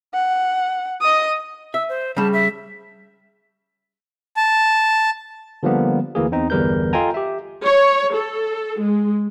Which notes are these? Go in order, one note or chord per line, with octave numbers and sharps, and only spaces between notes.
F#5
D#5 D#6
E5 E6
C5
C#3 G3 A5
E5
A5
D3 F3 G3 A#3 B3
D2 E3 A#3 G#4
E2 C4 D#4
G1 E2 G3 A#4 B4 G6
F4 A4 D#5 G5 G#5 A#5
G4 E5
C#5
A4
G#3